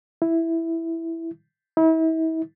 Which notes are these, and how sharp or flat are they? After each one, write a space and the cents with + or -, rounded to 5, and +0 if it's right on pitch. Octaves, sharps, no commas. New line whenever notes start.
E4 +0
E4 -40